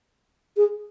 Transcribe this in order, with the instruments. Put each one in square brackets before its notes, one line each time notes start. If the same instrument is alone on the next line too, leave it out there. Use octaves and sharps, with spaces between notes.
[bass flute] G#4